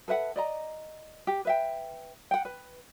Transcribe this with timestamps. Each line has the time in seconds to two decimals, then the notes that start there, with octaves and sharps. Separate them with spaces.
0.08 A4 B4 E5 F#5
0.36 D5 D#5 A#5
1.27 G4
1.45 B4 E5 G5
2.31 F#5 G5
2.45 B4